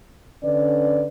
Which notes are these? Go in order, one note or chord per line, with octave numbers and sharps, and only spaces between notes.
D3 C#4 B4 D5